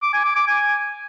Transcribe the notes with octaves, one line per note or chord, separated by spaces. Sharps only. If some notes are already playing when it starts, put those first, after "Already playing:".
D6
G#5
D6
D6
G#5